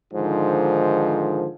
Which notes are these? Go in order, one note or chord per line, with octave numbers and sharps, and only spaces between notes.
G#2 D3 D#3 F3